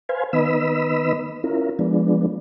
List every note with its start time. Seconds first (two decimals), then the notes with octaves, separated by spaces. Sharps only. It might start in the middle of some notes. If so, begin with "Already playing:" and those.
0.09 B4 C5 F5 G#5
0.33 D#3 B3 B4 D#5 B5 E6
1.44 C#4 E4 F4 A#4
1.79 F3 G#3 B3 D4